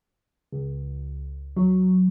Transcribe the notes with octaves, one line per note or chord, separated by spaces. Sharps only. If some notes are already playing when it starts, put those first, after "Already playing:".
C#2
F#3